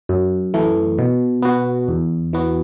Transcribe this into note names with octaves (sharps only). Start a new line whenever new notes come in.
F#2
E3 A3
B2
B3 F#4
E2
E3 B3 F#4